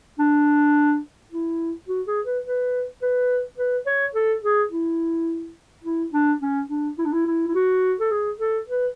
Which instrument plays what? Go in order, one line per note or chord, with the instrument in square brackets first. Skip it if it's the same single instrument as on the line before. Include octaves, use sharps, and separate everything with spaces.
[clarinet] D4
E4
F#4
G#4
B4
B4
B4
B4
C#5
A4
G#4
E4
E4
D4
C#4
D4
E4
D4
E4
E4
E4
F#4
A4
G#4
A4
B4